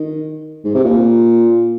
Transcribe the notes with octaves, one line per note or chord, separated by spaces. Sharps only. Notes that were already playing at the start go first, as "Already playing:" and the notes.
Already playing: D#3
G#2
C3
A#2